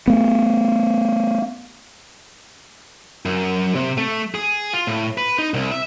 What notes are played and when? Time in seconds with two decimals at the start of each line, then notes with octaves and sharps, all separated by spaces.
0.07 A3 B3
3.25 F#2
3.75 C3
3.98 A3
4.35 G#4
4.73 F4
4.87 A2
5.18 B4
5.38 D#4
5.54 C2
5.72 E5